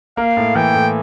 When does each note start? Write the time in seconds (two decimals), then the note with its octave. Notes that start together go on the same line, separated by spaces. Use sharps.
0.17 A#3 F5
0.37 A2
0.55 E3 G5
0.74 A2